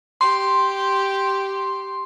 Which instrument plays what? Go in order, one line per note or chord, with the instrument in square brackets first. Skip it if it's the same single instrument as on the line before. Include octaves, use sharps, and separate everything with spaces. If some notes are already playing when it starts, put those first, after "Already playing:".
[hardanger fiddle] G4 [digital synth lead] C6